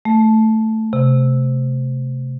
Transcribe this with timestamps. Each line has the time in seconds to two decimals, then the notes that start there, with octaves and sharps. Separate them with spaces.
0.05 A3
0.93 C3